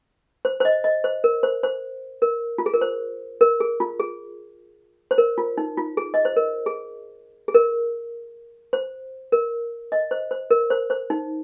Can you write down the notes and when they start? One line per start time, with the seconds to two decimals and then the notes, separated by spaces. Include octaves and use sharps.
0.45 C5
0.60 C5
0.65 D#5
0.84 D#5
1.04 C5
1.24 A#4
1.43 C5
1.63 C5
2.22 A#4
2.58 F4
2.66 G#4
2.74 A#4
2.81 C5
3.41 A#4
3.60 G#4
3.80 F4
4.00 G#4
5.11 C5
5.18 A#4
5.38 F4
5.58 D#4
5.77 F4
5.97 G#4
6.14 D#5
6.25 C5
6.36 A#4
6.66 G#4
7.48 G#4
7.54 A#4
8.73 C5
9.32 A#4
9.92 D#5
10.11 C5
10.31 C5
10.51 A#4
10.70 C5
10.90 C5
11.10 D#4